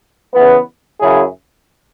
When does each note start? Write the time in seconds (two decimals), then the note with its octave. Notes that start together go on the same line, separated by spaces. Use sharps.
0.34 C#3 E3 B3
1.00 F#2 C#3 F#3 E4 G#4